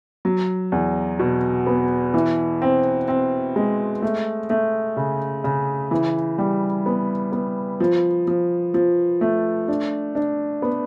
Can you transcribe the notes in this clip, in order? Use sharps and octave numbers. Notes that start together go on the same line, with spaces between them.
F#3
E2
B2
B3
E3
C4
C4
G#3
A3
A3
C#3
C#3
E3
G3
B3
B3
F3
F3
F3
A3
D4
D4
B3